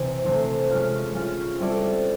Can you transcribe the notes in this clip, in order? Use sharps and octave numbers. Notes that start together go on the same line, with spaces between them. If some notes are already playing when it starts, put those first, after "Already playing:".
Already playing: C3 E3 C4
C3 E3 A3 C4
G#3 C#4 F4
G#3 C#4 F4
G3 C4 E4 A4 D5